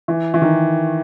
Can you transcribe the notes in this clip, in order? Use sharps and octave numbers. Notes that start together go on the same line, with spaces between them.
E3
E3
D#3